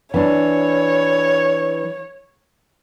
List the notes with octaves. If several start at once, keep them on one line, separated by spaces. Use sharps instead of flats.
E3 D4 C#5